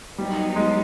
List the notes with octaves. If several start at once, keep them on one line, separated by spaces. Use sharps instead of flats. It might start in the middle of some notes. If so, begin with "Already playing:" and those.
F#3 G3 B3 D#4 G4
G#3